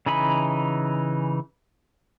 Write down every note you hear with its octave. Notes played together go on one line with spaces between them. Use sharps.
C#3 E3 D#4 G#5 B5